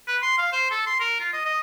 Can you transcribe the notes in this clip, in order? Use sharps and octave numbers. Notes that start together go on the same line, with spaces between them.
B4
C6
F5
C5
A4
C6
A#4
F4
D#5
D#5